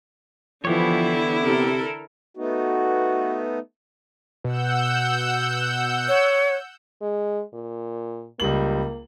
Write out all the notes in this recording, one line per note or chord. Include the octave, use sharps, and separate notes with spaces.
D3 E3 F3 B3 E4 G4 C#5
C3 A4 A#4
A3 B3 D#4 F#4
B2 F#5 E6 G6
C#5
G#3
A#2
C#2 G3 A#3 F#7